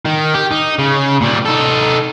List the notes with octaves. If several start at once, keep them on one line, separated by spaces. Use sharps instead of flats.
D#3
G4
D#4
C#3
A#2 G3
D#4 A4